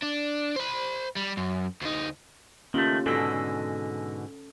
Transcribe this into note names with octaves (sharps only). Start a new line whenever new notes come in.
D4
C5 B5
G3
F#2
D2 D#4
D#3 A3 A#3 C#4 F4 G4
G#2 B2 D3 A4 G#5 E6 A#6